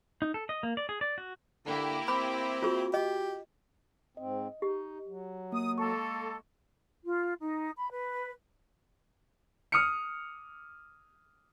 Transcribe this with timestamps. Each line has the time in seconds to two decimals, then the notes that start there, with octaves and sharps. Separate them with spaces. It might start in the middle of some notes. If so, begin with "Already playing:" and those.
0.22 D#4
0.34 A4
0.49 D#5
0.63 A#3
0.77 D5
0.89 G#4
1.01 D5
1.18 F#4
1.66 D3 A#3 E4 G4
2.08 C4 B5 D6
2.62 F4 F#4 G#4
2.94 G4 D#5
4.17 G#2 C4 D#5
4.62 D#4 G4
5.07 F#3
5.52 A#3 D#6
5.78 G#3 A#3 A4 C#6
7.05 F4
7.40 D#4
7.77 B5
7.91 B4
9.72 D#6 F6 C#7